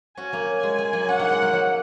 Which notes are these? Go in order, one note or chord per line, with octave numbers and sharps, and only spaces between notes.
C#4 F#4 G#5
F#3 A#3
G#3
G#3
F#3 A#3
C#4 F#4 F#5
A#3 D#4
G#3 C#4
F#3 A#3
F#3 A#3